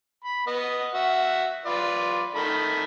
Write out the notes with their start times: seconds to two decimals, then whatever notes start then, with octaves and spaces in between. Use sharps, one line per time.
0.24 B5
0.47 B3 D#5
0.94 F#4 E5 F#5
1.65 F4 B4 D5
2.35 D#3 A3 B5